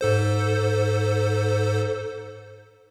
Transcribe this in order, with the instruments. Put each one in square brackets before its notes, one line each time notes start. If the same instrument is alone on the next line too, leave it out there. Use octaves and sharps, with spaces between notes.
[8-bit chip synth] G#2 A4 C5